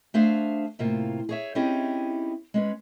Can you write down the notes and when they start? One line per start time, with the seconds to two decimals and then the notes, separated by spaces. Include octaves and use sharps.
0.14 A3 D4 G#4 C5 E5 F5
0.79 A2 C3 A#3 F4
1.29 G#4 C#5 E5
1.55 C4 C#4 D#4 E4 G4 G#4
2.54 G#3 C#4 B4